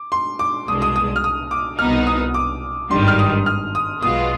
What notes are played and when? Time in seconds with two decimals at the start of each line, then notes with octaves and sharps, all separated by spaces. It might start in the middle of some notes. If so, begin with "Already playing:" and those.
Already playing: D6
0.12 C6
0.39 D6
0.68 C2 B2 G#3 D4 D#6
0.82 D#6
0.96 D#6
1.16 F6
1.24 D#6
1.51 D6
1.79 C2 B2 B3 D#4 F6
2.07 D#6
2.34 D6
2.91 G#1 G2 D#3 G3 C6
3.08 F6
3.19 D#6
3.46 F6
3.75 D#6
4.02 B1 B2 G#3 B3 F4 D#6